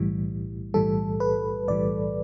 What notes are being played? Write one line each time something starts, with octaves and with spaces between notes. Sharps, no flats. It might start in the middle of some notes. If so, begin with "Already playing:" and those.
Already playing: B1 A2 E3 G3
B1 A2 E3 G3 A4
B4
B1 A2 E3 G3 D5